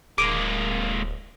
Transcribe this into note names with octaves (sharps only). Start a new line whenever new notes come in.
D1 G#3 A#3 D6 D7 D#7